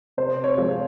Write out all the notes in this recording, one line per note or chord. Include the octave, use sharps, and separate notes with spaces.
C3 C5
C#5
F3 G#3 C4
C#5